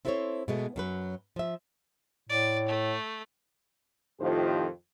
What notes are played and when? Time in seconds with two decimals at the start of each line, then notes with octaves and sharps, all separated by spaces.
0.05 C4 E4 A4 A#4 C5 C#5
0.48 B2 G#3 A3
0.76 F#2 F#3 B4
1.36 F3 E5
2.29 A2 D5
2.68 A3
4.20 F2 A2 D#3 F4 G4 C5